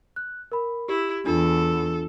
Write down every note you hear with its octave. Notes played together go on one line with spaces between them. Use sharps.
F#6
A#4 B5
E4 G4
E2 D4 F4 A4